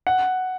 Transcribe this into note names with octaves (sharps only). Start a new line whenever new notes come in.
F#5